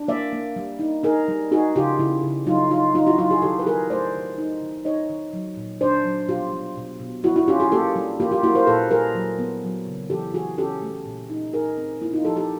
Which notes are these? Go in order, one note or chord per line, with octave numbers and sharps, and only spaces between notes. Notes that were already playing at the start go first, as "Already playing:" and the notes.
Already playing: D4
A#3 D5 E5
A#3
G3
D#4
D#4 G#4 A#4
G3
D#4 F#4 G#4
C#3 F4 G4
C#3 E4
C#3
F#3 D#4 F4
D#4 F4
D#4 F4
E4 F#4
F#3 D#4 F4
F#4 G#4
D#3 G4 A4
B4
D#3 G#4 A#4
A3 C5 D5
D#3
D#4
D#3
D#4 C#5 D#5
D#3
F#3
A#2
D4 C5 D5
F#3
B2 F4 G4
G3
B2
B2
G3 E4 F#4
E4 F#4
C#4 F4 G4
F#4 G#4
A#3 G4 A4
G3
A#3 F4 G4
F4 G4
A#3 E4 F#4
A#4 C5
A#2 A4 B4
G3 G#4 A#4
F#3
B3
F#3
C#3
E3 G4 A4
E3 F#4 G#4
C#4 G4 A4
A3
A#2
D#4
D#4 G#4 A#4
C4
A#3 E4
D#4 F4
F3 G4 A4
G4 A4